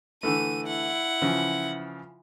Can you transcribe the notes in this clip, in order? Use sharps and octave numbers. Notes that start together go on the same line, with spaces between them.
D3 E3 A3 D#7
E4 F#5
C#3 E3 F3